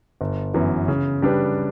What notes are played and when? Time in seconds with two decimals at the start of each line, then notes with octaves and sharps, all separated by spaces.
0.21 G1
0.54 F#2 E3 B3
0.88 C#3
1.22 G3 D4 G4 B4